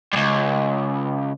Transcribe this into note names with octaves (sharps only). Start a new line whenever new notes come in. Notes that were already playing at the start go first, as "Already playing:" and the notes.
C#2 G2